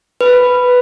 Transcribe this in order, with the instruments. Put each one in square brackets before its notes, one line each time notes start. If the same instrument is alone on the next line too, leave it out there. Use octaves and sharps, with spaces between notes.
[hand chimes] B4